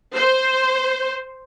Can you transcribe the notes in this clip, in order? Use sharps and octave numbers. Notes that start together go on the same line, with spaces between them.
C5